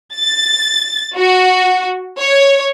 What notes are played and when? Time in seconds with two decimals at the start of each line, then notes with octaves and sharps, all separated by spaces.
0.14 A6
1.16 F#4
2.19 C#5